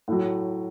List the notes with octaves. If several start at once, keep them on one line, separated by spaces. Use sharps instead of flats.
A2 F#3